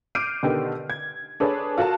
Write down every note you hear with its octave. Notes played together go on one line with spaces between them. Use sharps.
D6 F6 G6 C7 D7 D#7
B2 D3 D#3 B3 D4 G4
G#6
D4 G#4 A4 B4 C#5
F4 F#4 A4 A#4 A5